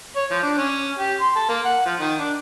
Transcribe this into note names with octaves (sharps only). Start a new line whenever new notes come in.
C#5
F3
D4
C#4
G4
C6
A4
A#3
F#5
F3
D#3
D4